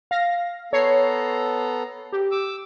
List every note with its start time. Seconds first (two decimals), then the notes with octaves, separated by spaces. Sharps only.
0.11 F5 A#6
0.73 B3 A4 C#5 A#5 C7
2.12 G4
2.31 D6 E6